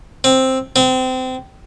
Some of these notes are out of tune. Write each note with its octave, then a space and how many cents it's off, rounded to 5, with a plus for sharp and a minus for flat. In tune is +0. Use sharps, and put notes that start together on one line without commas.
C4 +5
C4 -25